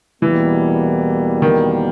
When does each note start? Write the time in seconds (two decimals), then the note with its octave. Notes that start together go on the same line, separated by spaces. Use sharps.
0.22 E2 B2 E3 G3 A#3
1.42 D#3